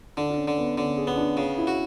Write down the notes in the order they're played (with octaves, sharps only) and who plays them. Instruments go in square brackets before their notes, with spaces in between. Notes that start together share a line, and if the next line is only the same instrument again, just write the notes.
[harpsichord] D3 [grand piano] D4
[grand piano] D4
C#4
[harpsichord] D3
[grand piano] B3
[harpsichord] D3 [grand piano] C#4
[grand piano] G#4
[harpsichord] B3 [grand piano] C#4
[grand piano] D4
[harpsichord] C#3 [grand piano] C#4
[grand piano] E4
[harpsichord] F#4